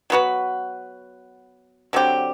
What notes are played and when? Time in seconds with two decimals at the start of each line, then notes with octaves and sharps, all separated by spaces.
0.10 F#3 B3 F#4 B4
1.93 D3 F#3 C4 G4